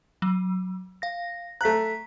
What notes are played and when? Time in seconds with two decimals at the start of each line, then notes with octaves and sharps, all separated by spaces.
0.22 F#3
1.02 F5 A#6
1.61 A3 A#5 F#6 B6